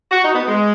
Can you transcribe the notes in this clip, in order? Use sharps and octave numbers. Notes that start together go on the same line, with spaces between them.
F#4
D#4
B3
G#3